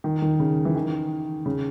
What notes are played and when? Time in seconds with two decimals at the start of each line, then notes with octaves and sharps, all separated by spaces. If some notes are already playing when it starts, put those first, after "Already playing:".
0.04 D#3
0.22 D#3
0.39 C#3
0.65 E3
0.75 D#3
1.46 C#3